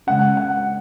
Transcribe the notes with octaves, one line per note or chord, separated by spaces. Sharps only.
C#3 G#3 C#4 F#5
F#5